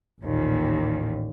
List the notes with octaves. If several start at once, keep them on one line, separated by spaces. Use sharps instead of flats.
A1 D#2 A#2